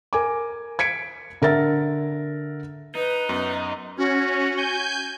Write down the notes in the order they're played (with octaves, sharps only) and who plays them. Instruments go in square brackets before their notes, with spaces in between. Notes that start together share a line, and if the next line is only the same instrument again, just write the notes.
[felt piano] A#4 G#5 D6
G#6 B6 C#7 D7
D3 A#4 E5 A6
[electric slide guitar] D#4 [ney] B4
[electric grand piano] F#2 B3
[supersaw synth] C#4 [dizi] F#4
[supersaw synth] G#5 G6